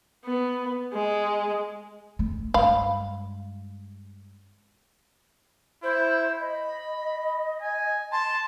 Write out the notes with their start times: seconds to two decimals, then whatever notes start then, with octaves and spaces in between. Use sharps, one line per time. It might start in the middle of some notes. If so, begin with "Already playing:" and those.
0.25 B3
0.93 G#3
2.19 A3
2.54 G2 G#3 F5 B5
5.83 E4 C5
6.40 D#5 B5
7.62 G#5
8.12 A5 C6